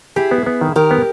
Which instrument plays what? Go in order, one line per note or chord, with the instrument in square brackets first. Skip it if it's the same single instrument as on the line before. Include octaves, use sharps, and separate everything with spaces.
[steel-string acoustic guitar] E4 G#4 [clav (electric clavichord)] G4
[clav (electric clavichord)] B3
B3
D#3
[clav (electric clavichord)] D#3 [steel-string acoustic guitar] G4 A#4
[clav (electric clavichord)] B3